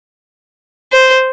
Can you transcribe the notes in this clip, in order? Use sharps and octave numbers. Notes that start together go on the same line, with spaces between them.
C5